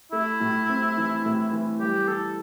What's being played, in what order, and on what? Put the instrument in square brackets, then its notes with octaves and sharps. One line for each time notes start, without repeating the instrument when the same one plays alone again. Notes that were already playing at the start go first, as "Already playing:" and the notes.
[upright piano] A3 [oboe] E4
[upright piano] A2
C4
E3
A2
E3
[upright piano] G3 [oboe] G4
[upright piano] E3 [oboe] A4